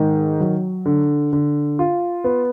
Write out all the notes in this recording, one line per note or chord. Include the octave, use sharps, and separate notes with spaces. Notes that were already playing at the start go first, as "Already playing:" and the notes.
Already playing: G#2 D#3
F#3
D3
D3
F4
B3